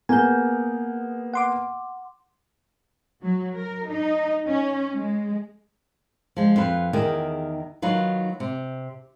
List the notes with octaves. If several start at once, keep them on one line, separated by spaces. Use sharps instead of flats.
A#3 B3 G#4 G#5 G6
F#5 C6 D6
F#3
A#4
D#4
C#4
G#3
F3 G#3
F2 F4 B4
E2 D#3 G4 G#4
D#3 F#3 D#4 F4 B4
C3